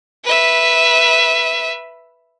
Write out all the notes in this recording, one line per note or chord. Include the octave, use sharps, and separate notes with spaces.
B4 E5